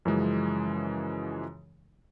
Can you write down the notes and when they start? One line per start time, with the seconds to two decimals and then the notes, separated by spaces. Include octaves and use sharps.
0.05 F#2 C#3 E3 F3 G#3